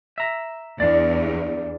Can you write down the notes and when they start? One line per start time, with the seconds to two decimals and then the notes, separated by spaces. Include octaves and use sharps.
0.18 E5 A#5
0.80 E2 D4 D5